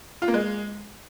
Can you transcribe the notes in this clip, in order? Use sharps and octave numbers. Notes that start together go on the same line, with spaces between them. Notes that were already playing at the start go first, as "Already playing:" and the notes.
F4
A#3
G#3